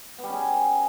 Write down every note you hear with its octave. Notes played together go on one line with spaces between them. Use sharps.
B3
G3
C#4
G#4